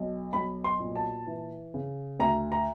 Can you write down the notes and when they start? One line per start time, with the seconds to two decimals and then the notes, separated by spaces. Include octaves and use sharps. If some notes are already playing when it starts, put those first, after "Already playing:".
Already playing: B1
0.33 B1 B5
0.64 C6
0.80 A#2
0.96 A5
1.27 E3
1.74 C#3
2.19 D2 A#5
2.52 A#5